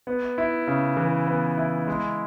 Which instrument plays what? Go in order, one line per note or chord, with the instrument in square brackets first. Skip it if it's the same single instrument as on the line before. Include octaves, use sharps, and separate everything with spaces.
[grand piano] B3
E4
C#3
E3
B3
E4
G#3